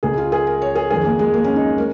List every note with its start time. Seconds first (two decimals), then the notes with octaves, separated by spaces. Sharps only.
0.03 C#2 C#3 G#3 G#4
0.18 F4
0.32 G#4
0.47 A#4
0.62 C#5
0.75 G#4
0.90 F2 D#3 G#3 G#4
1.05 A#3
1.19 G#3
1.34 A#3
1.44 C#4
1.56 D#4
1.78 G#3 A#4